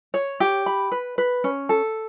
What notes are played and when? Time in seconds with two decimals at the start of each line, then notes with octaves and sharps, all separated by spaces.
0.14 C#5
0.40 G4
0.66 B5
0.92 B4
1.18 B4
1.44 C#4
1.69 A4